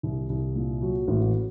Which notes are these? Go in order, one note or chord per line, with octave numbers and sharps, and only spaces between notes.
C2
C2
A#2
F#3
A1